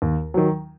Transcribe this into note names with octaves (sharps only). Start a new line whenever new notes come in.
D#2
D#3 F#3